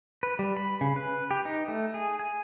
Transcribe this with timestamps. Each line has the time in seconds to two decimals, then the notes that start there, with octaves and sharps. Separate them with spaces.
0.23 B4
0.39 G3
0.57 B5
0.81 C#3
0.96 B4
1.31 G4
1.45 D#4
1.68 A3
1.94 G#4
2.19 G#5